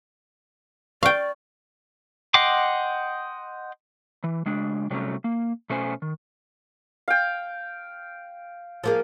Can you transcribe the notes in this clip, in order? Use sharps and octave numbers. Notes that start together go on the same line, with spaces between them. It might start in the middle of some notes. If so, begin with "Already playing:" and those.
D5 F5 G5 C#6
D#5 F#5 G5 C6 D6
E3
C#3 G#3 D4
C3 F#3 G3 A3 A#3 C#4
A#3
B2 A3 C#4 C5 G#5
D#3
F5 G5
F3 A#3 G#4